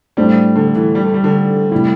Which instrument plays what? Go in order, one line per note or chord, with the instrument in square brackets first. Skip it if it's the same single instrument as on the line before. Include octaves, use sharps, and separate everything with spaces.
[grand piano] A2 A3 D4 A4 C5 [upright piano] G3
[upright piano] D3
E3
G3
A3
G3
D3
[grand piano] C3 A3 E4 [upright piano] G3